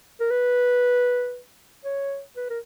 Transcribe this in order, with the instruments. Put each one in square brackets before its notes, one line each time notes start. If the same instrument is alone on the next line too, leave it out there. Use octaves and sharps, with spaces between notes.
[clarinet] A#4
B4
C#5
B4
A#4